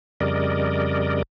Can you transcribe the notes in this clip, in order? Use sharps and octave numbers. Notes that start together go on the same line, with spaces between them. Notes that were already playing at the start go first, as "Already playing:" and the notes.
F2 C#3 G3 A#4 D5 D#5